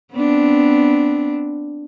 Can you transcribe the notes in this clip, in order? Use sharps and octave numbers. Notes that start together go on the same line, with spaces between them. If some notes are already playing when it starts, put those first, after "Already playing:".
B3 C4 D4